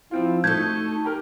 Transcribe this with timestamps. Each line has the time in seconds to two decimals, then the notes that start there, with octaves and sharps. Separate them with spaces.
0.11 F3 C4 E4 F4
0.44 A3 D#4 F#4 A4 A5 G6 G#6
1.05 G4 A#4